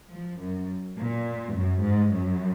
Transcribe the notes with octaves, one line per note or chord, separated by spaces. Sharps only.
F3
F#2
A#2
F#2
G#2
F#2